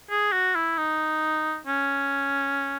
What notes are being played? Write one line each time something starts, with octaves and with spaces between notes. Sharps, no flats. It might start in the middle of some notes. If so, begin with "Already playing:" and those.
G#4
F#4
E4
D#4
C#4